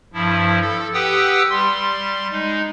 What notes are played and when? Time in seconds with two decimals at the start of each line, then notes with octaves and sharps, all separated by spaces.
0.13 G2 F3 E4
0.61 A4
0.94 G4 B4 F#5 G5 D#6 E6
1.50 G3 C6
2.31 G#3 D#4